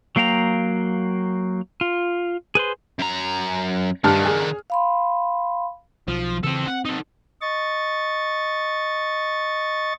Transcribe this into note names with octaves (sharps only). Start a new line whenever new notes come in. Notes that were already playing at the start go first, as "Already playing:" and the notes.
F#3 A#3 F5 G5 A#5
F4
G#4 B4 C5 C6
F#2 A#5
G2 D3 D#3 A5 F6
G#4
F5 B5 C6
B1 F3
C#3 E3 C4 A4
C4 F#5
D#4 A4
D#5 C#6 A6